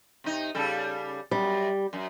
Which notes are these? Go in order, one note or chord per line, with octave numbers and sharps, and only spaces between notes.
C3 D#4
C#3 G3 A4
F#2 G3
F#2